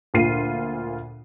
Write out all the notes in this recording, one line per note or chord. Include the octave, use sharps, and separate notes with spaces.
D2 A#2 F4 C7 D#7